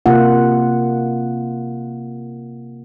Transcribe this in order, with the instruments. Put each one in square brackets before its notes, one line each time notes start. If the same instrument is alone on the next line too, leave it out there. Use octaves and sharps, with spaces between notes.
[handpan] C3 A#3 F4 F#5